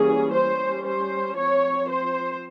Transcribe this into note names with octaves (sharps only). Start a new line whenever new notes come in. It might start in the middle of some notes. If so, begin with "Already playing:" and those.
Already playing: E3 G3 A#3 C#4 G#4
G3 C#4 C5
C5
F3 C4 C#5
C5